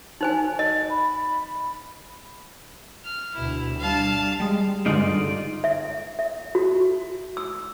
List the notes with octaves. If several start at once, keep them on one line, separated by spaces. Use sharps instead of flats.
D#4 C5 G#5
D#5
B5
F6
D2 B2 E4
G3 D4 F5 A5
G3 G#3
G2 D3 G#3 D#4 F4 D5
E5
E5
F#4
E6